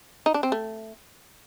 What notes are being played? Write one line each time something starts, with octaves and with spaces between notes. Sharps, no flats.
D#4
D4
C4
A3